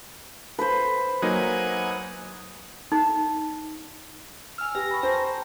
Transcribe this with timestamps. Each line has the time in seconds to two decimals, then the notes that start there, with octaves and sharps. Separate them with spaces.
0.59 B4 C5
1.22 F#3 A#3 D#4 F#5 G#5 D#6
2.92 D#4
4.58 G#5 E6 F6
4.75 G4 B4 G#5 A#6
4.91 B5 C#6
5.03 C5 G5 A5 A#5